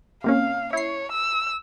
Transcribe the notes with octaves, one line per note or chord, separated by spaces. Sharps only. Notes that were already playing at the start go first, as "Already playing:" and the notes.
C3 A#3 C#4 F5
E4 C#5 C7
E6